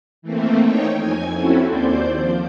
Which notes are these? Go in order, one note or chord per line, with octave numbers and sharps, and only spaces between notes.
E3 A3 A#3 C4
D#4 C#5 G5
F2 G#5 G#6
C4 C#4 E4 F#4 A4
D#2 C5 D5 G6
F3